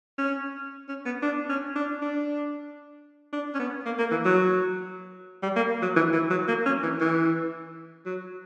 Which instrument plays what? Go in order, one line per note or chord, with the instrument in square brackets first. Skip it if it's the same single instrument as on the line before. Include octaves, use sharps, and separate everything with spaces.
[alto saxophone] C#4
C#4
B3
D4
C#4
D4
D4
D4
C#4
B3
A#3
A#3
E3
F#3
G3
A#3
F#3
E3
E3
F#3
A#3
C#4
E3
E3
F#3